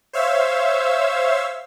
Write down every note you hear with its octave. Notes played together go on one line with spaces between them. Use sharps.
C5 C#5 E5 F5 E6